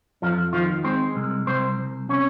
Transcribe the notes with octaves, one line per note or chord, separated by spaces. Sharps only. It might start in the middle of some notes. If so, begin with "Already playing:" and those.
F2 F3 F4
D#3 F3 F4
G#3 C4 C5
C2
C2 C4 C5
C2
C3 C#4 C#5